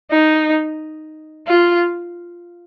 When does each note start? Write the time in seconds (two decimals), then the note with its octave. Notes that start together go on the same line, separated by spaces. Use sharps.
0.10 D#4
1.47 F4